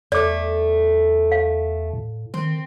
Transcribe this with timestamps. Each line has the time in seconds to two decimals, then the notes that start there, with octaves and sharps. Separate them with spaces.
0.12 E2 A3 D5 D6
1.32 F5
1.93 A2
2.34 D#3 C4